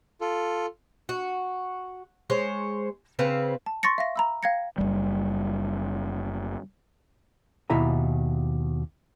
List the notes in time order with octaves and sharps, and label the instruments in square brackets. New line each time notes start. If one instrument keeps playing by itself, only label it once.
[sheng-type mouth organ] F4 A4
[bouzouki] F#4
G#3 C5 C#5
C#3 C4 B4 F5
[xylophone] A5
C6 C#6 A6 A#6 C#7
E5 F5 A#6
A#5 B5 E6
F5 G5 G#6 A#6 C#7
[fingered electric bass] F#1 C2 G3
[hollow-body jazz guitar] D#2 B2 E4 E5 G#5 A#5